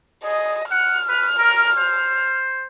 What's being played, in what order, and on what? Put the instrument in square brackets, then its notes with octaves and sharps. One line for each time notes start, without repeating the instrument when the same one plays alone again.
[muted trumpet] G#4 [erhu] D#5
[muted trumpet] F#5 [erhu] F6
[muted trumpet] B4
A#4
C5